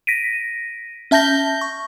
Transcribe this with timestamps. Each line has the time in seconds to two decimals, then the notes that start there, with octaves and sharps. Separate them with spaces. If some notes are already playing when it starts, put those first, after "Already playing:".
0.07 A#6 B6 D7 D#7
1.11 C#4 E5 A5 G6 A#6 G7
1.61 C#6